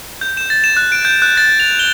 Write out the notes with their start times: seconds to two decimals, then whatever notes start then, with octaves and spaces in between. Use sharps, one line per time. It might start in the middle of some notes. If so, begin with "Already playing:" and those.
0.21 G6
0.37 E7
0.50 A6
0.64 E7
0.77 F#6
0.92 D7
1.05 G6
1.22 F#6
1.37 A6
1.60 F7
1.79 G7